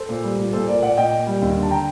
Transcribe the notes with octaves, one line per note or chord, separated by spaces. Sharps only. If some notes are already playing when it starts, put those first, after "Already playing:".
Already playing: A4 C5
A#2
G3
A#2
A#2 A4 C5
A#2 A#4 D5
A#2 D5 F#5
A#2 D#5 G5
A#2
G3
D#2
D3
A5
G5 A#5